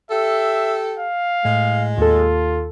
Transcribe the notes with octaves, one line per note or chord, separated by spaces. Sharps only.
G4 A4 E5
F5
A2 G#3
D#2 F4 A4